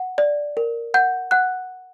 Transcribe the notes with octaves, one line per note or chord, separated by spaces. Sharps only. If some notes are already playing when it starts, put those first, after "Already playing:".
Already playing: F#5
D5
A#4
F#5 G6
F#5 F#6